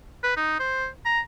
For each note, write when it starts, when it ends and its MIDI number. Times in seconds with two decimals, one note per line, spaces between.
0.24 0.35 71
0.37 0.57 63
0.60 0.87 72
1.05 1.20 82